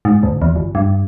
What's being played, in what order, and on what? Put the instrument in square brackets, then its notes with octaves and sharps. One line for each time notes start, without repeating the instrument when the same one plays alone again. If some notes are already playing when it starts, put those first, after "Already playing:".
[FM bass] G#2
D2
E2
G1
G2